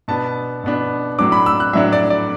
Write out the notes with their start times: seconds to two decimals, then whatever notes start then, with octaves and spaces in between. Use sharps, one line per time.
0.08 B2 B3 D4 A5
0.64 B2 B3 D4
1.18 A2 F#3 D4 D6
1.32 B5
1.46 E6
1.60 F#6
1.73 A2 F#3 D4 E5
1.93 D5
2.10 D5